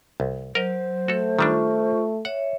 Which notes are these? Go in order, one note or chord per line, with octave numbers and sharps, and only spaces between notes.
C2
F#3 A#4 C5 D#5
A3 F#4 A4
D#3 G3 D4 F4 C#6
C#5 E5 F#5